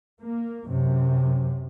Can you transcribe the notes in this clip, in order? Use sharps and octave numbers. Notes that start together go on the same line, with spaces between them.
A#3
F#2 C3